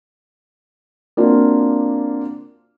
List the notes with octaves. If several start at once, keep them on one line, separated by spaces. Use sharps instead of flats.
A#3 C4 D4 F4 F#4